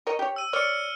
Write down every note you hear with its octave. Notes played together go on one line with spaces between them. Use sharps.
A#4 C#5 D#5
G4 C#5
E6 D#7
C#5 D5 F6 C#7